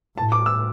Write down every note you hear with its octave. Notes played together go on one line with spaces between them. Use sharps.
A2 A5
D6
E6